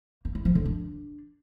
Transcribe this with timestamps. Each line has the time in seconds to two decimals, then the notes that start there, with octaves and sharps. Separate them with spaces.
0.25 A#3
0.35 E4
0.45 F3
0.55 D3
0.65 D4